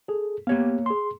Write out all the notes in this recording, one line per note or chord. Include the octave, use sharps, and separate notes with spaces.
G#4 A4
A#3 B3 G4 C#5 F5
G#4 C6